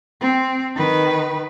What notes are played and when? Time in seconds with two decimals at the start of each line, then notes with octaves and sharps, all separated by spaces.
0.21 C4
0.76 D#3 B4